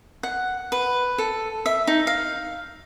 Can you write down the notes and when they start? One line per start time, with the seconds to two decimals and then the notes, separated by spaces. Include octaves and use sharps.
0.23 F#5
0.72 B4
1.18 A4
1.66 E5
1.87 D#4
2.07 F5